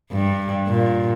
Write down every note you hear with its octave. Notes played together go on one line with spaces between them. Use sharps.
G2
A#2